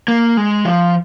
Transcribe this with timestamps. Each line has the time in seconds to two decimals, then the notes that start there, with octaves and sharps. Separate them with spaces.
0.08 A#3
0.37 G#3
0.65 F3